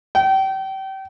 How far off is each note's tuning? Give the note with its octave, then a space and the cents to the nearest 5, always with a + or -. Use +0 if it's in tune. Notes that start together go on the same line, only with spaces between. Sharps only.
G5 -30